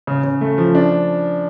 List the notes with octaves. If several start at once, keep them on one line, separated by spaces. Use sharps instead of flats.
C#3
C#3
A3
F3
D4